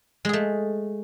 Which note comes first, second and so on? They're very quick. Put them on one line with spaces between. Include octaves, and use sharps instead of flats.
G#3 G#4 A3